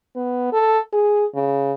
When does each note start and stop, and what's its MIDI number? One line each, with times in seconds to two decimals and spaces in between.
0.16 0.53 59
0.53 0.80 69
0.93 1.25 68
1.35 1.73 49